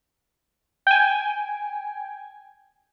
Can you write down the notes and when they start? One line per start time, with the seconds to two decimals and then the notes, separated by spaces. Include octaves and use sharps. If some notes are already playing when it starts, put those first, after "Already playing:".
0.87 G5 G#5